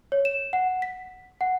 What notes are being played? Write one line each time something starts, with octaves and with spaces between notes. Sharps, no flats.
C#5
E7
F#5
B6
F#5